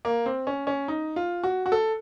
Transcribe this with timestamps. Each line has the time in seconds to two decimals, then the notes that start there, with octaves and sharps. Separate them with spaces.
0.05 A#3
0.26 C4
0.47 C#4
0.67 C#4
0.88 D#4
1.16 F4
1.43 F#4
1.66 F#4
1.72 A4